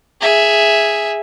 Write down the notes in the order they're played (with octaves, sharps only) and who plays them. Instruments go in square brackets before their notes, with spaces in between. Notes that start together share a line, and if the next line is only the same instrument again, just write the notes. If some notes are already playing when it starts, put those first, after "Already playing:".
[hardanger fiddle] G#4 E5